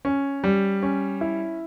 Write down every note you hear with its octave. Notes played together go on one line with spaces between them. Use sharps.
C#4
G3
C#4
E4